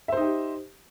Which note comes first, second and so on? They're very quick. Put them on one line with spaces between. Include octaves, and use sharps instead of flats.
E5 C5 D#4 G4